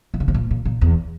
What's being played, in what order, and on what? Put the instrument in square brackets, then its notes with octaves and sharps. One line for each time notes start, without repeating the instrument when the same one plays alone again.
[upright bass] E3
D3
C3
A#2
A#2
A#2
E2